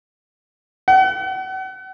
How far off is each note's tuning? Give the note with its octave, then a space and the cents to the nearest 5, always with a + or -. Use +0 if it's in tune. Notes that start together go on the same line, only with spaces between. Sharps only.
F#5 +40